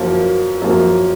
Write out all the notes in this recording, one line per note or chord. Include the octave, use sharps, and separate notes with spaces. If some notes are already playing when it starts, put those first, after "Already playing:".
Already playing: F#2 F3 A#3
F#2 F3 A#3